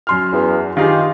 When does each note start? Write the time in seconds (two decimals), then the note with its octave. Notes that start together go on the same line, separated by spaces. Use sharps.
0.07 F#2 C6 F6
0.33 E2
0.77 D#3 D#4 F4 G4 G#4